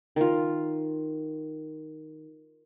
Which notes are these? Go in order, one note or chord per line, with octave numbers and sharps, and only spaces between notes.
D#3 F4